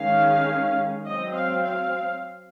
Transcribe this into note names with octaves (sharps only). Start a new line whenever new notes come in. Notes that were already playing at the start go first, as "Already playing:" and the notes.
Already playing: D#3 G#3 C#4 F5
F#3 C4 D#5
F5
F5